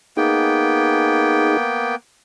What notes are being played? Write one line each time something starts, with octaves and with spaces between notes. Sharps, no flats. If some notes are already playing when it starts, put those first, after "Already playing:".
A#3 B3 D#4 G#4 G5